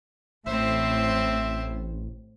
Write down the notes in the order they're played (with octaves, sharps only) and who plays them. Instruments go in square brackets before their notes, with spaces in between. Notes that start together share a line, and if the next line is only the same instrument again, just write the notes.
[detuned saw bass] A1 [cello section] A2 [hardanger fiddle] C4 C5 [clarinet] E5